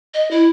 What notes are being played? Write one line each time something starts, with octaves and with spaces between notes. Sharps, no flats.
D#5
E4